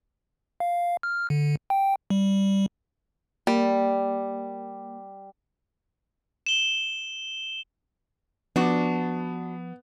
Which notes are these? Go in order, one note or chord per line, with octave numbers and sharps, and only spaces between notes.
F5
F6
D3
G5
G3
G3 A#3
E7 G7
F3 B3 D4 F#4